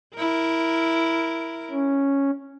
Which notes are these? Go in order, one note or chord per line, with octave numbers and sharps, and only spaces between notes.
E4 A#4
C#4